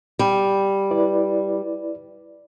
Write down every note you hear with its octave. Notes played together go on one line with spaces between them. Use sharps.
G3
E4 B4 D5